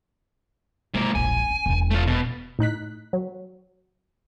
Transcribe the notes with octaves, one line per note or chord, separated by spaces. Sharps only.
G#2 F3 A#3
E1 A#1 G#5
C#4
E1 E2
A3 F4
B2
A2 D#4 F#6 B6
F#3